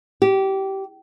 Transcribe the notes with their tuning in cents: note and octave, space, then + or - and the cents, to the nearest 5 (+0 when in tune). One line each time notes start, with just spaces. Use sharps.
G4 -20